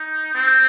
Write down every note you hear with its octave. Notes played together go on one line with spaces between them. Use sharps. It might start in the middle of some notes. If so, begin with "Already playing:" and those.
Already playing: D#4
C4